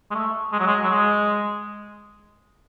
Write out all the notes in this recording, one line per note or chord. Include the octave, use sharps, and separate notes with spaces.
G#3
A3
G#3
F#3
G#3
F#3
G#3